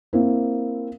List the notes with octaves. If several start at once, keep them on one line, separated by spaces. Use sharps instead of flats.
A#3 C4 E4